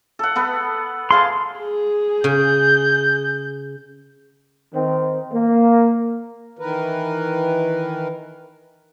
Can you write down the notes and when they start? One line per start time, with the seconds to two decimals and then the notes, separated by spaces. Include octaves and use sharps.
0.19 A4 F#5
0.36 B3 A4 B4
1.11 G#4 F5 A5 C6
1.60 G#4
2.24 C#3 G6
4.73 D#3 C4
5.31 A#3
6.59 D#3 E3 A#4 B4